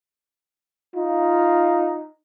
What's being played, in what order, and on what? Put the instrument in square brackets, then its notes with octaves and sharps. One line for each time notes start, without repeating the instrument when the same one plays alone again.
[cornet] D#4 [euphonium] F4